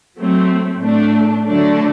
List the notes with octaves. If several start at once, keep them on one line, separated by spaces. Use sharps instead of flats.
F#3 A3 C4
A2 A3 D4
D3 F#3 A3 D4